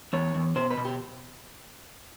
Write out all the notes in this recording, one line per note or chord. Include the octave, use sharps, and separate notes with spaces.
E2 C#5
E2
B2 C5
B4
B2
G4